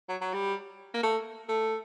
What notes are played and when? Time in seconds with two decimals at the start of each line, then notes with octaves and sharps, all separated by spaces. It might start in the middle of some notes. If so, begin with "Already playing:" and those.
0.09 F#3
0.21 F#3
0.33 G3
0.94 A#3
1.03 A3
1.49 A3